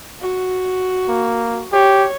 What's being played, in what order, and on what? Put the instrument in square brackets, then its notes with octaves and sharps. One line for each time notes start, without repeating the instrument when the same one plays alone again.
[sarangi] F#4
[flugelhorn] A#3
[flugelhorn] G4 [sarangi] C#5